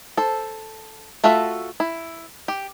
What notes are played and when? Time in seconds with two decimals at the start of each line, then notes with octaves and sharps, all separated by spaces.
0.17 A4 C5
1.24 A3 F4 F#4 A4 E5
1.80 E4
2.48 G4